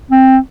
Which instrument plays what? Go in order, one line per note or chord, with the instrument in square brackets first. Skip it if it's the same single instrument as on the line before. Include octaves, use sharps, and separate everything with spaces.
[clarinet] C4